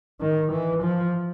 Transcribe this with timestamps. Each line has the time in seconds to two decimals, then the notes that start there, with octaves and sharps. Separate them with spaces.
0.21 D#3
0.51 E3
0.83 F3